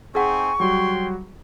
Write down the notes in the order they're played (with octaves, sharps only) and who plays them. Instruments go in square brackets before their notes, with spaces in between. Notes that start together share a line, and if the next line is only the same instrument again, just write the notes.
[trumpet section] C4 D#4 G#5 [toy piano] G#4 F#5 [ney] C#6
[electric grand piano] F#3 G3 F#4 [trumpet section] C#5 G5 C6